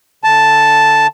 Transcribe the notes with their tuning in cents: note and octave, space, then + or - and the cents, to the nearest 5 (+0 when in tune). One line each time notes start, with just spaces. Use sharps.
D3 +0 A5 +0